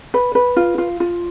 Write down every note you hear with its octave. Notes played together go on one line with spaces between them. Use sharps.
B4
B4
F4
F4
F4